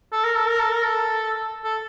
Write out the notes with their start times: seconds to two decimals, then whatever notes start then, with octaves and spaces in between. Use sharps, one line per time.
0.12 A4
0.24 A#4
0.36 A4
0.49 A#4
0.59 A4
0.72 A#4
0.84 A4
1.64 A4